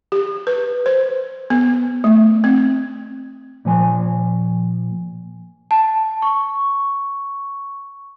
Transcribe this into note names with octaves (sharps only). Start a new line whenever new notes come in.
G4
B4
C5
B3
A3
C4
A#2 F3 G#5 C6
A5
C#6